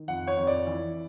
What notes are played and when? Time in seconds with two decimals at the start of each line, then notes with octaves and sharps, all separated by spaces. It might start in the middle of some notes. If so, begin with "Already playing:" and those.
Already playing: D#3
0.08 F2 F#5
0.27 C#5
0.37 F2
0.47 D5
0.67 E3